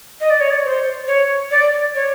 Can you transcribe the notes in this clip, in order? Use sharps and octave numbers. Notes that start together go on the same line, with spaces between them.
D#5
D5
C#5
D5
C5
C#5
D5
C#5